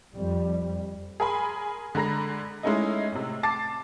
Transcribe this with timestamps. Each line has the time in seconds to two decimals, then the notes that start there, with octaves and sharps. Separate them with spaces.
0.14 F2 G3
1.20 G#4 A#4 G#5 B5 C6
1.95 D3 G#3 A#5 B5 A#6
2.63 G#3 A3 C#4 D#4 E4 D#5
3.12 A2 C3
3.43 A5 D6 A6 C7